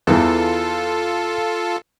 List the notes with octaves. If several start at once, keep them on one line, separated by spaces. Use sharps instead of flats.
E2 E3 F4 A4